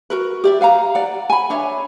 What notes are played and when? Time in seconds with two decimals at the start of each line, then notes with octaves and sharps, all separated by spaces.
0.10 F#4 A#4 B4
0.44 G4 D5 E5
0.61 B4 F5 F#5 A#5
0.95 D5 F#5
1.30 G#5 B5
1.50 D4 C#5 E5